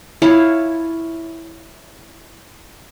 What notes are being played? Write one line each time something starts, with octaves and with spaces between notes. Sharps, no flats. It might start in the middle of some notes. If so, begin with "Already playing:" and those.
E4 F4 C#5 A5